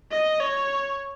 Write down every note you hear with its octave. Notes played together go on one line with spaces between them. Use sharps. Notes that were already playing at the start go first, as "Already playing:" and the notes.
D#5
C#5